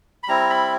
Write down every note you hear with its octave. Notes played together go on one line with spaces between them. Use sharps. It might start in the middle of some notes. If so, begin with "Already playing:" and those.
B5
G3 C4 E4 A#5
B5